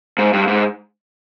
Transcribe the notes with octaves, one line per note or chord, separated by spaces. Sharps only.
G#2
G2
G#2